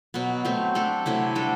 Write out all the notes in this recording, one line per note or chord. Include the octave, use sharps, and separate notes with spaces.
B2 F#3 B3
F#3 A3 C4
A3 D4 A4
C3 F#3 A3 E4
G3 D4 A4